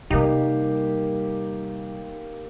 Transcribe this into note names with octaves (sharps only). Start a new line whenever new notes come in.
C3 G3 A#3 D#4 G4